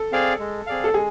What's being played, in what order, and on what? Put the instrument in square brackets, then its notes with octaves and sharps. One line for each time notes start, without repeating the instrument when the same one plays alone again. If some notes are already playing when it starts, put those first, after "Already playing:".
Already playing: [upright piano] A4
[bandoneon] C4 G#4 D5 F5
G#3
C4 G#4 D5 F5
[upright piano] A4
[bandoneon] G#3 [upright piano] G#4